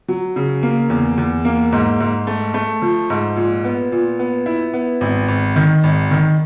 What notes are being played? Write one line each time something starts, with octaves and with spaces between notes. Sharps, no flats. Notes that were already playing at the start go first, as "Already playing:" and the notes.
F#3
C#3
A#3
E2
E2
A#3
G#2
G#2
A3
A3
F3
G#2
A#2
B3
A#2
B3
E4
B3
G#1
G#1
D#3
G#1
D#3